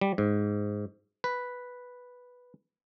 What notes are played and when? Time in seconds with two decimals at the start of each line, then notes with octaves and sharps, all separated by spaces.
0.01 G3
0.18 G#2
1.24 B4